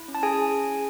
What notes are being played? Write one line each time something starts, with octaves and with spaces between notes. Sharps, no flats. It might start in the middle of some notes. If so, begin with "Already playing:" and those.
Already playing: E4
C#4
A5
G#4 G#5